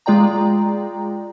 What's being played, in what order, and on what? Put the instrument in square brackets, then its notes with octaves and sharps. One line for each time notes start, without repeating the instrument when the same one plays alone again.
[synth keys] G#3 F4 D5 G5 A#5